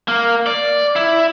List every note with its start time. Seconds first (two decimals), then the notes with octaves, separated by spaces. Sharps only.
0.08 A#3
0.46 D5
0.96 E4